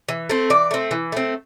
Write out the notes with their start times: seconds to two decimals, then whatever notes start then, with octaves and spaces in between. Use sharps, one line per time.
0.09 E3
0.30 A3 C4
0.50 E3 D5
0.71 A3 C4
0.91 E3
1.12 A3 C4